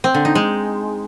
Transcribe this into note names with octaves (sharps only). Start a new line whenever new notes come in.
C4
D3
D#4
G#3